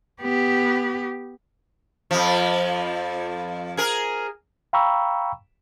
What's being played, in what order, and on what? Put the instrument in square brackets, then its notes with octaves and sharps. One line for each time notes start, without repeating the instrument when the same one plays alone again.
[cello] B3 G4
[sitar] F2 F3
G#4 A#4
[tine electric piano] F5 G5 A#5 B5 C#6 E6